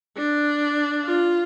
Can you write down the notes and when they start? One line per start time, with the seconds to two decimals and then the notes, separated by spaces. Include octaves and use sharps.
0.17 D4
1.05 F4